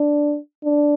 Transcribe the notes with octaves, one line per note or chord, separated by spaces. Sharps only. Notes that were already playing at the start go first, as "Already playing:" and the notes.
Already playing: D4
D4